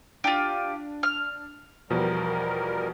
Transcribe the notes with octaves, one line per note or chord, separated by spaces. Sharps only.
D4 F4 G4
F6
E2 B2 F3 G3 A#4